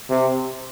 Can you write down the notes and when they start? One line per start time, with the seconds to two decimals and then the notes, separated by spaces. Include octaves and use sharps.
0.10 C3